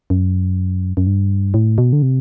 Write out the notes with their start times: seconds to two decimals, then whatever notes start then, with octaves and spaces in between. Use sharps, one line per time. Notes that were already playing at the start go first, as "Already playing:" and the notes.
0.10 F#2
0.97 F#2
1.07 G2
1.54 A2
1.78 B2
1.93 D3
2.02 C3